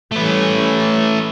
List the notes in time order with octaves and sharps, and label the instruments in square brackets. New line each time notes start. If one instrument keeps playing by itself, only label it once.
[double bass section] E3 G3 C#4 [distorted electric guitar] A3 B4